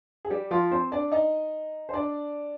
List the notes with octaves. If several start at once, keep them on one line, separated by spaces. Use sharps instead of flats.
G#4
G3 G4
F3 F4
C4 C5
D4 D5
D#4 D#5
C5
D4 D5